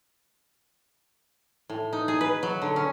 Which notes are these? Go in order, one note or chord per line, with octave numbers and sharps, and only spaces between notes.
A2
D#4
G#4
B4
F#3
D3
C#4